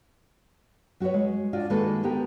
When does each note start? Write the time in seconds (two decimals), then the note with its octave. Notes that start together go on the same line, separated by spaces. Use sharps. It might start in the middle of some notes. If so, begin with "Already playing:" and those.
1.00 F#3 F#4 G4 B4 C#5
1.14 G#3
1.53 D4 F4 F#4 D5
1.70 D#3 G#3 A#3 F#4 A4 B4
2.03 D3 B3 G4 A#4